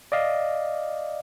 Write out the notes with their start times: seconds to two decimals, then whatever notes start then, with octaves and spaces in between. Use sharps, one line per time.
0.12 D5 D#5 F5